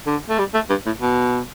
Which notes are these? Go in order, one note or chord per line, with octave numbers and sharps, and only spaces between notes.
D3
A3
G3
A3
G2
A2
B2